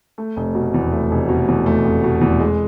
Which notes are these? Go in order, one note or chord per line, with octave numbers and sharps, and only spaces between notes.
A3
F1
B2
E2
A3
F1
B2
E2
A3
F1
B2
E2
G#3